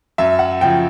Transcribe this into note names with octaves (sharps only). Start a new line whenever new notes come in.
F#2 E5
F#5
C#3 F3 G5